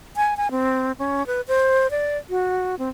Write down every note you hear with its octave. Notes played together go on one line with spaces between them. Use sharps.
G#5
G#5
C4
C#4
B4
C5
D5
F#4
C4